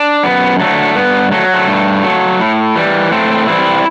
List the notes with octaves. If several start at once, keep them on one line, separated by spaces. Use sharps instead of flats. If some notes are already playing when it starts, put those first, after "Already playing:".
Already playing: D4
F#2 B3
D3 F#3 A3
G2 B3
F#3 A3
A3
G2
F#3
A2
E3 G3
A2 A3 C4
E3 G3 C4 E4